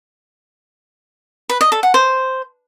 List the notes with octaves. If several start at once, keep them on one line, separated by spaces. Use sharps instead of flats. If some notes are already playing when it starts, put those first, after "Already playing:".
B4
D#5
A4
F#5
C5